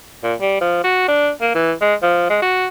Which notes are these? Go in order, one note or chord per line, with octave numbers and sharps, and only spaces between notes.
A#2
G3
F3
F#4
D4
A#3
E3
G#3
F3
G#3
F#4